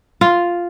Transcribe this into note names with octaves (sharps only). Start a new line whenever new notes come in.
F4